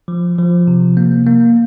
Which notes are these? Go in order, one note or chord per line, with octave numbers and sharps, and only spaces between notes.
F3
F3
C3
A#3
A#3